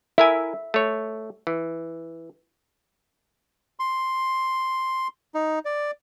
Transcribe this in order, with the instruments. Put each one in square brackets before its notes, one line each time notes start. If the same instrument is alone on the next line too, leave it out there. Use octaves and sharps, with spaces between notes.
[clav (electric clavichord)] E4 A#4 G#5 [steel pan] E5
[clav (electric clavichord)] A3 C#5
E3
[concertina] C6
D#4
D5